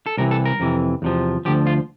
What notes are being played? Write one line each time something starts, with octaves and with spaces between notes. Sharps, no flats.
A4
C2 C3 E3 A#4
A4
A#4
F2 C3 E3
E2 C3 F3
D2 D3 F3 G4
F4